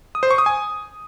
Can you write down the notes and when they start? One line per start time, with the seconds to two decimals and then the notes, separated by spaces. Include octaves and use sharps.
0.15 D#6
0.23 C5
0.31 C#6
0.38 D#6
0.46 G#5